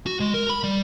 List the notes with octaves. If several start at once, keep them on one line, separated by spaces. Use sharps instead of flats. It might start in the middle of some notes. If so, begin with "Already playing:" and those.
F#4
G#3
A#4
B5
G3